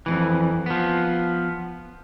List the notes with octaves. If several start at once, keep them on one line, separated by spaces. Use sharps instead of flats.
F2 G#2 E3
F3 B3